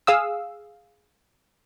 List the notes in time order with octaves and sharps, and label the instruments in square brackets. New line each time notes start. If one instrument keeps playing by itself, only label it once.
[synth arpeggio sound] G#4 F5 D#6 E6